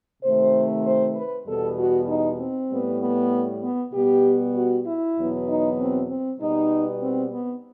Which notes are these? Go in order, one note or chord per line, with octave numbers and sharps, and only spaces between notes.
C3 D#3 A3 C5
C5
B4
E2 B2 G3 B3 A4
F#4
D#4
C4
A2 G3 B3
B3
B3
B2 G3 B3 G4
F#4
E4
E2 B2 F#3 B3
D#4
C4
C4
B2 G3 B3 D#4
C4
B3